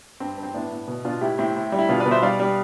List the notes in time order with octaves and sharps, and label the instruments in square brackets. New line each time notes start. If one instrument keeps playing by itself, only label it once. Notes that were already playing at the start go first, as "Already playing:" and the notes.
[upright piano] G2 C4
G2
C4
A2 B3 D4
A2
B2
B2 D4 F4
A2 E4 G4
A2 C4 E4
A2
G3
E4
B2 D4 F4
B4 D5
B2
C5 E5
G3 D5 F5
G3